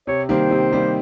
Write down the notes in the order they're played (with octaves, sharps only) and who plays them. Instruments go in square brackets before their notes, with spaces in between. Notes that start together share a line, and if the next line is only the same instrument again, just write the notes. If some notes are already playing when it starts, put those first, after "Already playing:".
[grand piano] C3 [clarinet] C#5
[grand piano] D#3 G3 A#3 [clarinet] C5
[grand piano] C3
D#3 G3 A#3